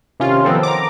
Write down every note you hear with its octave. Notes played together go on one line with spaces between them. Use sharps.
C3 D#3 C#4 F4
D#3 F3 B3 C4 A4
A#5 D6